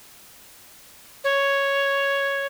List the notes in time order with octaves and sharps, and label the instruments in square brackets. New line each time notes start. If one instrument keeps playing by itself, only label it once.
[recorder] C#5